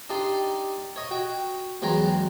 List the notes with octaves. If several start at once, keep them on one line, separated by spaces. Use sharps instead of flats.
D4 D#4 G4 D5 C6
C#5 D#5
F#4 G5
E2 F#3 G#3 G5 A#5